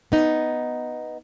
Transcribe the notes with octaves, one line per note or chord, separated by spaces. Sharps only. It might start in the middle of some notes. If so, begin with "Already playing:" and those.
B3 D#4